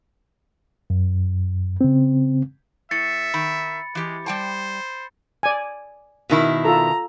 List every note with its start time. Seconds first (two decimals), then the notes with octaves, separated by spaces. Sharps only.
0.90 F#2
1.81 C#3 C4
2.91 A2 E5 A6 C#7
3.34 D#3 B5
3.95 E3 G#3 G4
4.26 G3 C5 G5 A5
5.43 D5 G#5
6.30 B2 D#3 E4
6.65 F4 A4 A#5